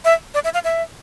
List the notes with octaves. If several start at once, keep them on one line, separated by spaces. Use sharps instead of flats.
E5
D5
E5
F5
E5